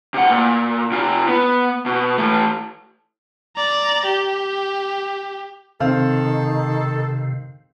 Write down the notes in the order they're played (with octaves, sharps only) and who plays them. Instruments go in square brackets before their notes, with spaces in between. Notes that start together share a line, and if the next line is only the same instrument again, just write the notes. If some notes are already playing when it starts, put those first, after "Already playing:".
[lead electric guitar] C3 F#5
A#2
C3 F4
B3
B2
E3 A3
[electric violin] D5 A#5
G4
[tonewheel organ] C3 [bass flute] D#3 [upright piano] C4 F5 [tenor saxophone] A4